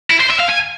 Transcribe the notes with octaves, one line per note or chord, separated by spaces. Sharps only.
E4
C5
E5
F5
G#5